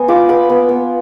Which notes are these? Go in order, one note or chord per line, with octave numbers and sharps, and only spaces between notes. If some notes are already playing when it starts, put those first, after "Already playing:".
Already playing: B3 G#5
F4 B5 D6
B3 B5 D6
B3
B3